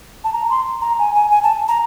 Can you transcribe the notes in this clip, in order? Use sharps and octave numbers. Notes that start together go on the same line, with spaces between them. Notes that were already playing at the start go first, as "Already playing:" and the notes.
A5
A#5
C6
A#5
G#5
G#5
G#5
A5
A#5